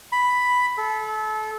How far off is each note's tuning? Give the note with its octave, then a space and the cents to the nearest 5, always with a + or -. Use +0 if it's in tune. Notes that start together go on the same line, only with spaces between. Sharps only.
B5 +5
A4 -30